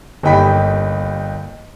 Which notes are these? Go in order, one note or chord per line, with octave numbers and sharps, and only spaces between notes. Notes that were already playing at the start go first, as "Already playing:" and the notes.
G1 A#3 D#4 G5 B5 B6